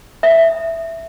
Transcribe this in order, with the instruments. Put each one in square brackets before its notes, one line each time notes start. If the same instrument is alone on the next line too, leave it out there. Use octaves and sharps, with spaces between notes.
[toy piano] E5